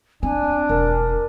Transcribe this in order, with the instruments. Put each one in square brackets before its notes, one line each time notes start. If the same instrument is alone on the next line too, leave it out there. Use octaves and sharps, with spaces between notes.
[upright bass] C4 [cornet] D4 [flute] G#5
[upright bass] E1 [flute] A#4